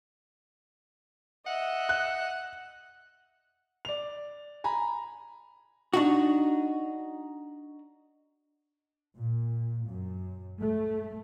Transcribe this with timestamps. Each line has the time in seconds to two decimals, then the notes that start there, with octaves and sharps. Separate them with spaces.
1.47 D#5 E5 F#5
1.89 F#6
3.85 D5 F7
4.64 G#5 A#5 B5
5.93 D4 D#4 F#4
9.17 A#2
9.87 F#2
10.61 A3